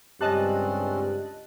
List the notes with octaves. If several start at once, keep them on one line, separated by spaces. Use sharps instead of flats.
C#2 G2 C4 C#4 G4 D#5 A5 F#6